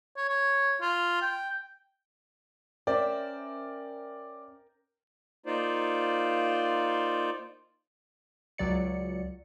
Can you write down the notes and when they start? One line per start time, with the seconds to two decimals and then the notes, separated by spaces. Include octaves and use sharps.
0.17 C#5
0.29 C#5
0.81 F4
1.22 G5
2.87 C#4 A#4 C5 D5 E5 G5
5.46 A#3 D#4 F4 C5 D5
8.58 C#2 F#3 D5 C#7